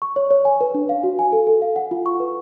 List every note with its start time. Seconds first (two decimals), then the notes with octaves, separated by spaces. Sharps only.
0.02 C#6
0.16 C#5
0.31 C#5
0.45 G#5
0.61 B4
0.74 D4
0.89 F5
1.03 F#4
1.19 G#5
1.33 A4
1.47 A4
1.62 F5
1.76 F#5
1.91 F4
2.06 C#6
2.20 B4